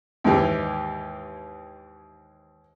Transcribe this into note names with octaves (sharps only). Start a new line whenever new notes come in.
D#2 G#2 E3 G4